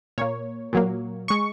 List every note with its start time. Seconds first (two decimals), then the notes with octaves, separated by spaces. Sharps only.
0.18 A#2 A#3 C#5
0.73 A#2 F#3 A#3
1.28 G#3 C#6